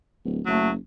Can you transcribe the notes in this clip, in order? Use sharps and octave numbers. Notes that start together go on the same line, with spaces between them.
D1
F#1 F#3 A3